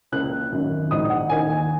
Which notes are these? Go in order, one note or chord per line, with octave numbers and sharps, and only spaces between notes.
C#2 C#3 A#3 F#6
G#1 F#2 D#3
A#1 G#2 D#3 D#6
F#5
D#2 D#3 A#3 D#4 G#5
G#5